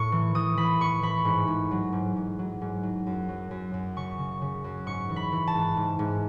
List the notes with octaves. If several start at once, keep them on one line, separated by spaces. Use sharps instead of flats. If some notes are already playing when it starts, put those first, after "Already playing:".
Already playing: A2 C#6
E3
E3 D#6
E3 B5
A2 C#6
E3 B5
G#2
G#2
F#3
G#2
G#2
F#3
G#2
F#3
F#2
F#3
F#2
F#2
C#3 C#6
C#3
C#3
F#2
G#2 C#6
E3
B5
E3
A5
G#2
G#2
G#2